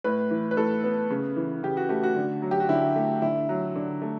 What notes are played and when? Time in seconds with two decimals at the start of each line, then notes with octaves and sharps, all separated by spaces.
0.04 A2 B4
0.31 E3
0.51 B4
0.57 A2 A4
0.84 B3
1.10 C#3
1.36 E3
1.63 C#3 G4
1.77 F#4
1.89 A3 G4
2.03 F#4
2.16 D3
2.42 F#3
2.51 G4
2.60 F#4
2.69 D3 E4
2.96 A3
3.22 D3 E4
3.49 F#3
3.75 D3
4.02 A3